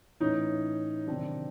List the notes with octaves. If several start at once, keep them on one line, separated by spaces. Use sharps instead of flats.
A2 E3 C#4 D#4
C3 D#3 F#3 C4 D4